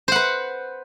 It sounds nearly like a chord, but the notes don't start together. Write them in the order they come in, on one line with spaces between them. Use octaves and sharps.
C5 F#5 B4